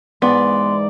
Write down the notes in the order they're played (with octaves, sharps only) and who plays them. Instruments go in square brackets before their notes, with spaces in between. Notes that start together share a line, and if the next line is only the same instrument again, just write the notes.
[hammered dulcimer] G#2 E3 [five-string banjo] B3 [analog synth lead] D5 [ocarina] C6